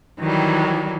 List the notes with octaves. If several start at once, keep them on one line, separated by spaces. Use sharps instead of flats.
D#3 E3 F#3 G3